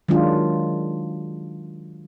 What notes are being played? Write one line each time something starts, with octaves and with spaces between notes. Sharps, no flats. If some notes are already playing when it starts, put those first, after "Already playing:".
D#3 F#3 G#3 D4 F4